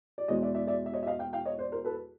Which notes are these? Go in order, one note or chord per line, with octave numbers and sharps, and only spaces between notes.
D5
E2 B2 G#3 C#5 D#5
D5 E5
D5 E5
D5 E5
E5
C#5 D#5
E5
D#5 F5
F5 G5
F5 G5
C#5 D#5
C5 D5
A#4 C5
A4 B4